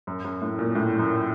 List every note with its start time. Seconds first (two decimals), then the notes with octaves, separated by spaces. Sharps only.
0.07 F#2
0.24 F#2
0.42 A2
0.59 A#2
0.75 A2
0.99 F#2